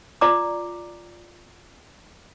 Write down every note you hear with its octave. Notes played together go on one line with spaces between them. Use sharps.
F4 D5 A#5 D6